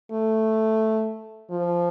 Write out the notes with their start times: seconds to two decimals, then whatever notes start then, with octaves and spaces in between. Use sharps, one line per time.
0.12 A3
1.50 F3